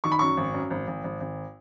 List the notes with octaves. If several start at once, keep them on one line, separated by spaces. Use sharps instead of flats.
D#3 C#6
B5
F#2 C#6
G#1
F#2
G#1
G#1
G#1
G#1